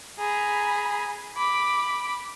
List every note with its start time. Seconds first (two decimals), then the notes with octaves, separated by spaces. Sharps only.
0.19 G#4 A#5 B5
1.37 B5 D6